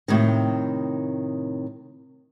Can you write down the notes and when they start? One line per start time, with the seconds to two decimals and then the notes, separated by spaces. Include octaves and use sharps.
0.08 A2 C3 D#3